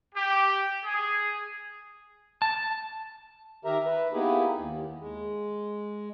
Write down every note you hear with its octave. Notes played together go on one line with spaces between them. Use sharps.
G4
G#4
A5
D#3 G4 A#4 E5 A#5
B4 E5
A#3 B3 D#4 E4 G4 G#4
D#2
G#3